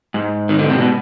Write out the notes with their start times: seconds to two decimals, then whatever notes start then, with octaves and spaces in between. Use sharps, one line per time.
0.14 G#2
0.49 D#3
0.59 D3
0.70 C3
0.78 B2